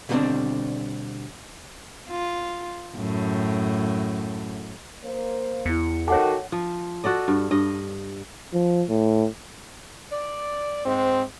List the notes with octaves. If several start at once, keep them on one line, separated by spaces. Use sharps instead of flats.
B2 D3 G3 A#3 C4 D4
F4
F#2 A2
A#3 C5
E2 E4 C#7
D#3 F#4 A4 C#5 F#5 G5 A5 D6
F3
F#4 A4 D5 D#5
G2
G2 D#5
F3
A2
D5
G#2 C4